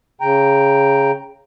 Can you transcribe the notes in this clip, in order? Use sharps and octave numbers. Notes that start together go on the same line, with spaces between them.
C#3 G5 A#5